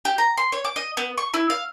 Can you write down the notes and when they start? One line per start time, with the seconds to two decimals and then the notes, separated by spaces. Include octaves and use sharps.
0.05 G4
0.18 A#5
0.37 C6
0.52 C#5
0.65 D6
0.76 D#5
0.97 B3
1.18 C#6
1.34 E4
1.50 F5